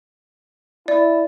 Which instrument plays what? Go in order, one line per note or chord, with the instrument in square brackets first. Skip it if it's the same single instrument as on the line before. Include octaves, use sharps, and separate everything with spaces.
[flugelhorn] E4 [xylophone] D5